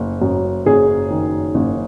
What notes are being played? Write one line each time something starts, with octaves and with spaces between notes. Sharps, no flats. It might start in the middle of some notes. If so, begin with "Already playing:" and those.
Already playing: F#1
F#2
F#1 G#4
D#3
F#1